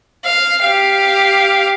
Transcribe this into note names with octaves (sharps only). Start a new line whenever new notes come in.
F5
G4 F5